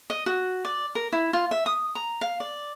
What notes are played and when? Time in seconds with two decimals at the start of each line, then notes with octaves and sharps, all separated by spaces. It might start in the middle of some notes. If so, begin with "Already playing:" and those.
0.10 D#5
0.26 F#4
0.65 D5
0.95 A#4
1.12 E4
1.33 F4
1.51 E5
1.66 D#6
1.95 A#5
2.21 F5
2.40 D5